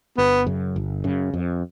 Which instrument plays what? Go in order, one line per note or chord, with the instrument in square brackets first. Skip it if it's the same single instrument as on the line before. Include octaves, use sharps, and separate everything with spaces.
[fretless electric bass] G1 [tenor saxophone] B3
[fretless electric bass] F#2 C#3
G1
F#2 C#3
F2